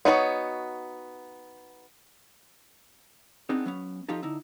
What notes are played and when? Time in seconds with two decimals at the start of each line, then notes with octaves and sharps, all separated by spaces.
0.05 B3 D#4 F#4 A#4 C#5
3.49 B3 C4 D4 D#4 G#4
3.66 F#3 B3 C#4
4.09 F3 D#4 F4 G4 A4
4.23 D3 D#4 E4